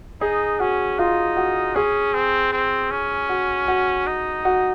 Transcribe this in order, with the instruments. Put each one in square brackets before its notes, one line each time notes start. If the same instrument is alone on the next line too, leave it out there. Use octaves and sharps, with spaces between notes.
[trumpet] D#4 [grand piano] G#4
[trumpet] C#4 [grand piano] F#4
[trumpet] D#4 [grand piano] F4
[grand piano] F#4
[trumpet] C#4 [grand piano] G#4
[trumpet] C4
C4
C#4
[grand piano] F#4
F#4
[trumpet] D#4
[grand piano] F#4